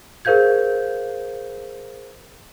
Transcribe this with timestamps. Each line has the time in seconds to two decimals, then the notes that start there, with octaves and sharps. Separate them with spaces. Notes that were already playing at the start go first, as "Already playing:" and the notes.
0.25 G#4 A#4 C5 F5 G6 G#6